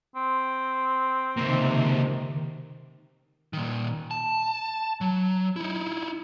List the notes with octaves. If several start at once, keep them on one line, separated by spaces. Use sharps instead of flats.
C4
C#2 C3 D#3 A#3
A#2 D#3
A5
F#3
D#4 E4